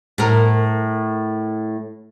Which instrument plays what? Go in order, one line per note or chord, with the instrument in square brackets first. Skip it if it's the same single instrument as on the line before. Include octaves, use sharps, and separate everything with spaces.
[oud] A2 A#4